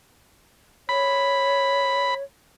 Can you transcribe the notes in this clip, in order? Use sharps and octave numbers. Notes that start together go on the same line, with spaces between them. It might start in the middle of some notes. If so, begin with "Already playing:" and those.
C#5 B5